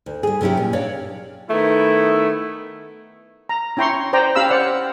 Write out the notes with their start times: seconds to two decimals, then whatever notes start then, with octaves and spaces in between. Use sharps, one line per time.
0.06 D2
0.23 G3 G#4
0.41 C3 F#3 C#4 E4 G4
0.57 A#2
0.73 D4 C#5 D5 F5
1.51 D#3 A3 B3 E4
3.49 A#5
3.77 C#4 E4 G5 A#5 C6 C#6
4.13 C5 D5 G5 A#5
4.35 C#4 G4 F5 B5 E6
4.50 C5 D5 F#5